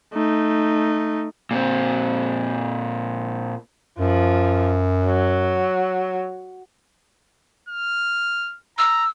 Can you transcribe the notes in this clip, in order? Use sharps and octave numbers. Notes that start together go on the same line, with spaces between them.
A3 D#4
A#2 C4
F#2 F3
F#3
F6
A#5 E6